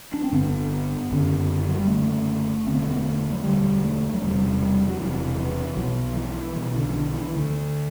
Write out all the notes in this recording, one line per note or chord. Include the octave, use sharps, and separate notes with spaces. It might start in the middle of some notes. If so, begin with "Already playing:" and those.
D4
C4
G1 G2 D3 B3
F#1 F#2 D3
F#3
G3
F#1 F#2 D3 A3
E1 D2 D3 C4
B3
A3
B3
A3
F#3
E1 D2 D3 G3
A3
F#3
E1 E2 C3 G3
G3
F#3
E1 E2 C3 E3
E3
B1 B2 F#3
E3
B1 B2 E3
D3
E3
D3
E3
D2 D3